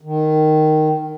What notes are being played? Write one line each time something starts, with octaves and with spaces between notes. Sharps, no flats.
D#3